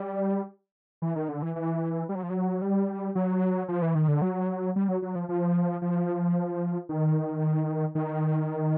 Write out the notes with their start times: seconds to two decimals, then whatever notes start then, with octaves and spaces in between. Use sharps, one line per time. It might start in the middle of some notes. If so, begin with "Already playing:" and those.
Already playing: G3
1.02 E3
1.16 D#3
1.28 D3
1.42 E3
1.56 E3
2.09 G3
2.15 F#3
2.23 F3
2.30 F#3
2.62 G3
3.15 F#3
3.68 F3
3.82 E3
3.95 D#3
4.08 D3
4.22 F#3
4.76 G3
4.89 F#3
5.02 F#3
5.15 F3
5.29 F3
5.82 F3
6.89 D#3
7.95 D#3